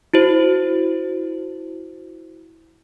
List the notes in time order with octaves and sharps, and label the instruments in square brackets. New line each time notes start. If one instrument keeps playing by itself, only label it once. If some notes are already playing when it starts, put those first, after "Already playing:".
[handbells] E4 F#4 C5